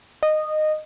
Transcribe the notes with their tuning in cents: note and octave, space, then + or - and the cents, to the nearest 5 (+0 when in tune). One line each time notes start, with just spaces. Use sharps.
D#5 -15